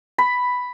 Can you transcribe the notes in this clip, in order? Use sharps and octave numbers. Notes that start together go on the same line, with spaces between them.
B5